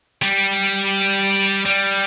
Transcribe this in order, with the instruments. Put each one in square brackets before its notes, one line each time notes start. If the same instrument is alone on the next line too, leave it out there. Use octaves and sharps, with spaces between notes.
[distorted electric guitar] G3
G3